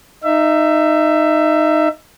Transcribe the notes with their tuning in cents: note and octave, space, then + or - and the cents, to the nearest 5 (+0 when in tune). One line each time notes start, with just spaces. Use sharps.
D#4 -10 E5 +20